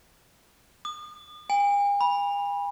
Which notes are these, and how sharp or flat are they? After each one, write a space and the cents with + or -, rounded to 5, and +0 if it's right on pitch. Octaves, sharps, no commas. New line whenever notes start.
D#6 -40
G#5 -45
B5 -20